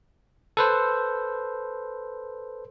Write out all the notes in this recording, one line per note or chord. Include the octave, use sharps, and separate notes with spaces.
A4 B4 C5